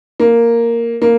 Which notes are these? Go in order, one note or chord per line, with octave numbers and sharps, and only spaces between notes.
A#3
A#3